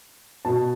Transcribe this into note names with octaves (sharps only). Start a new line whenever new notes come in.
B2 A5